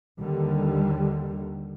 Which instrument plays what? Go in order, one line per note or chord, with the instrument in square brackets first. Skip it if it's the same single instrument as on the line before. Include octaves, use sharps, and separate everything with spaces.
[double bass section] D#2 D3 D#3 G3